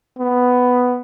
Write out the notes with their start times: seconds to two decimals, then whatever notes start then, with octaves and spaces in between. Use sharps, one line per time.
0.19 B3